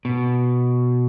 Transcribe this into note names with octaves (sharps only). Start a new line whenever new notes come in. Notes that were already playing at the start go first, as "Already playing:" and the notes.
B2